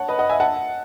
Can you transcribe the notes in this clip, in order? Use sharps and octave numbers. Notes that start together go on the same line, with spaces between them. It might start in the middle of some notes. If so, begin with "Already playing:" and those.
Already playing: C#5 F#5 A5
B4 D#5
D#5 F#5
E5 G#5
F#5 A5